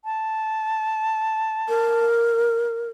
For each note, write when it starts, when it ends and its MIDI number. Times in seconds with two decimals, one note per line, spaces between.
0.05 2.06 81
1.68 2.89 70